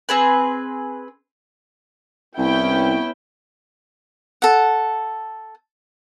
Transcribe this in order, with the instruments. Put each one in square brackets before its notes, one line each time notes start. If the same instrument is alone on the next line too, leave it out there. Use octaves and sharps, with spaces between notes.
[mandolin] C4 G#4 B4
[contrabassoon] C2 [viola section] B3 C#4 G5 [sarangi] E4
[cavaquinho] A4 F#5